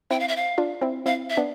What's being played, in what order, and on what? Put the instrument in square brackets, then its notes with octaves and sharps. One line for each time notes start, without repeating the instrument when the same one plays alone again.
[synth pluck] C4 E4 [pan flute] G5
[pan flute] F5
E5
F5
[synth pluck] D4 F4
C4 E4
[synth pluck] C4 E4 [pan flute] F5
[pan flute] E5
[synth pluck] B3 D4